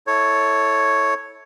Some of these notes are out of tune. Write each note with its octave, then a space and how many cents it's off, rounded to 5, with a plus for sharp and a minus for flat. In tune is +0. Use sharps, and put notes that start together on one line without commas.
E4 -25 A4 +0 C#5 +0